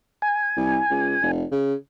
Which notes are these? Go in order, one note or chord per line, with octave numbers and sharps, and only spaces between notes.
G#5
C2
C#2
F1
C#3